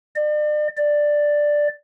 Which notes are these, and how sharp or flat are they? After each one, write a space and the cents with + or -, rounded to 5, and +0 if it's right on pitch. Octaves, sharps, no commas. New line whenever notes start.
D5 +40
D5 +5